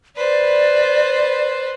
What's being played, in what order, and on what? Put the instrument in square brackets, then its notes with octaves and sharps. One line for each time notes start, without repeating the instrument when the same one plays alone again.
[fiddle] B4 C5 [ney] D5